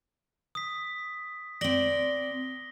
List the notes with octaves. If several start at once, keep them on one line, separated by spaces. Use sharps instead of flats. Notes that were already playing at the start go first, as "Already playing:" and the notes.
D#6 B6
C4 D5 A#6 F#7 G7